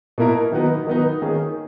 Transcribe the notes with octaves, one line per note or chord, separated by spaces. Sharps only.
B2 A#3 E4 A#4
D#3 F#3 B3 D#4
D#3 F#3 B3 D#4
D#3 A#3 C#4 G#4